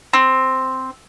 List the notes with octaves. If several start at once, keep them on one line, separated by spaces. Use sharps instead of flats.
C4